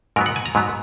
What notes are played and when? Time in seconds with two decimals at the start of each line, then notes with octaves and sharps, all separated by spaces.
0.16 G#2 F#3 B3 A#4
0.26 F#5
0.36 G#5
0.46 A#5
0.55 G#2 F#3 B3